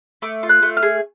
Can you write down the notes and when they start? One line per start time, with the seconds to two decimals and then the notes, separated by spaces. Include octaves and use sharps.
0.22 A3 D6
0.43 F4
0.49 F#6
0.63 A3
0.77 F6
0.83 G#4